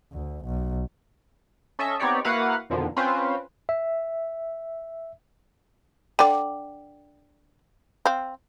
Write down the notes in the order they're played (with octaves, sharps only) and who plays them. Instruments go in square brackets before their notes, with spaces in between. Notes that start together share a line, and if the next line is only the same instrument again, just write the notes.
[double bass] D2
B1
[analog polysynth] C#4 A4 D#5 E5
B3 C4 D#4 G4 C#5 D5
A#3 E4 F#4 B4 F5 F#5
F2 B2 D3 D#3 F3
C4 C#4 F4 B4 C5
[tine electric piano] E5
[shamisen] D3 D5 [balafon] G5
[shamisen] C4 F5